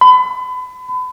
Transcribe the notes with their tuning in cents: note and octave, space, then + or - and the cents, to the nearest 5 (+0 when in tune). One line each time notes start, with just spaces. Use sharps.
B5 +35